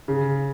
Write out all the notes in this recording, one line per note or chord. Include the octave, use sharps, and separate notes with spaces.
C#3